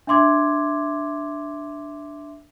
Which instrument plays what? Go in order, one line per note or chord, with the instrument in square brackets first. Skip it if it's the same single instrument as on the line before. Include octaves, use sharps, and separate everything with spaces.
[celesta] D4 E5 C6 D6 G#6